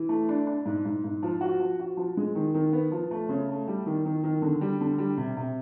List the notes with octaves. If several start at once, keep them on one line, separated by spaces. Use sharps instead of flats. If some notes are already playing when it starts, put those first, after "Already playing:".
Already playing: E3
A3
D4
D4
G#2
G#2
G#2
F3
F#4
F3
F#4
F3
G#3
D#3
D#3
B3
F3
A3
C#3
A3
G3
D#3
D#3
D#3
D3
G3
D3
G3
C3
C3